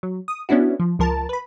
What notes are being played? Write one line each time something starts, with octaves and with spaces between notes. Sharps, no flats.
F#3
D#6
B3 C#4 D4 E4 F#4
F3
C#2 F3 A#4 A5
B4 B5